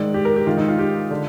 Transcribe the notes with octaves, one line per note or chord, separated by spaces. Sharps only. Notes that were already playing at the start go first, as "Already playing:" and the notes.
Already playing: G#2 D#3 D5
G4
A#4
G4
G#2 D#3 F4
D#4
F4
G4
D3